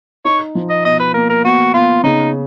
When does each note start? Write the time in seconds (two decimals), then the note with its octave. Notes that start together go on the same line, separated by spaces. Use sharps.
0.25 D#4 C#5
0.55 F3
0.70 D#5
0.85 B2 D#5
1.00 B4
1.14 A#3 A#4
1.30 A#4
1.44 B3 F#4
1.74 B3 F4
2.04 C#3 D#4